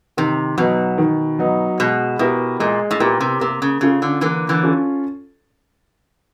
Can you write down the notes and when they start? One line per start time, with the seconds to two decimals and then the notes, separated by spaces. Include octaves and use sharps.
0.17 C3 D#3
0.58 B2 F#3 B3 D#4
0.98 D#3
1.39 F#3 B3 D#4
1.79 B2 G#3
2.19 B2 B3 E4 G4 A#4
2.60 A#2 G#3
2.91 A2
3.00 A#2 B3 E4 G4 A#4
3.21 C3
3.41 C3 A#3
3.62 C#3
3.81 C#3 C#4 F4 A4
4.02 D3
4.21 D3 E3 A#3
4.49 D3 E3
4.63 C#4 F4 A4